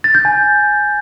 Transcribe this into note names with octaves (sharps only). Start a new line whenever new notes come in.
A6
G6
G#5